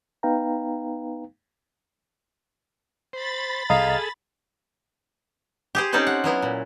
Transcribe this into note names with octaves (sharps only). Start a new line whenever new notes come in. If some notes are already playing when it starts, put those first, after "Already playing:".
B3 D#4 B4 F5 G5 A#5
C5 B5 A6
C2 G#4 A4 D#5 F5 A#5
G4 G#4 C5
C4 C#4 D#4 A4 C5 D5
F#5
F#3 B3 E4
A#2